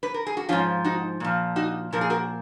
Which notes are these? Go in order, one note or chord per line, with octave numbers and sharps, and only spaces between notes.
B4
A#4
G#4
F#4
G#2 F3 C#4 F4
D#4 F#4
A#2 F3
D#4 F#4
A#2 F3 A#4
G#4
F#4 A#4